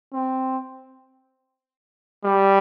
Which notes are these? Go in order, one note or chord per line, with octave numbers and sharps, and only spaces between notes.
C4
G3